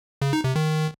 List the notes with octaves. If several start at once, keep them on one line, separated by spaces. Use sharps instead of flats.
C#3
D#4
C3
D#3